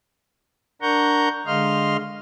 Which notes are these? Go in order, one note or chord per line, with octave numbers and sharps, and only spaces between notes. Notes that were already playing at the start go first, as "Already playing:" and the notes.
D4 A#4 F#5 A#5 C#6 G6
D3 G#3 D#5 F5 C6 F6